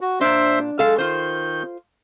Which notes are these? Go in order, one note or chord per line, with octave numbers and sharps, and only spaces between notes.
F#4
A#2 D4 C5 E5 C6
G#3 A4 F5
D#3 F4 C5 G6